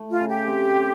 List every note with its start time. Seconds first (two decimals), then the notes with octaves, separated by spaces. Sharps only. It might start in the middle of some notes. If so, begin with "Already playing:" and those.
Already playing: A3
0.11 F4
0.20 C#3
0.29 G4
0.48 C4
0.75 C4